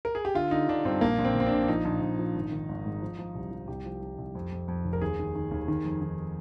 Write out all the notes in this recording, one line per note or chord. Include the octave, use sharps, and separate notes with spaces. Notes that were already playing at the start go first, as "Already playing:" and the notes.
A#4
G#4
G4
D3 F4
D3 D#4
D3 D4
G2 C4
A#1 A#3
A#1
C4
A#1 C4
A#1 D4
D4
F3 D#4
A#1
A#1
F3
G#1
D#3
G#1
G#2
F3
F3
C2
F3
C2 G4
F3
F3
C2
F2
F2
F2
F1
A#4
D#2 G#4
D#3
D#3
D#2
D#3
F2
D#3